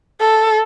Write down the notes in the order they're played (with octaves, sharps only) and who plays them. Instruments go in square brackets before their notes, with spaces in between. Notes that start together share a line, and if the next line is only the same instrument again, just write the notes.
[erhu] A4